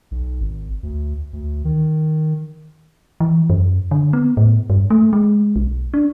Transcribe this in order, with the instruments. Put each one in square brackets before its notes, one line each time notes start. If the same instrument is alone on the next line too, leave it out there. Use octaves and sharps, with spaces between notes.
[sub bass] B1
G#1
D2
D2
D#3
[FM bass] E3
F#2
D3
B3
A2
G2
A3
G#3
B1
D4